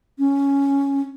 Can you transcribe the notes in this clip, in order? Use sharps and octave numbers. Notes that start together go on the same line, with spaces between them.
C#4